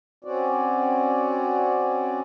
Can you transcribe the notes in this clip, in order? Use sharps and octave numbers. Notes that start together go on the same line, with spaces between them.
C4 C#4 F#4 D5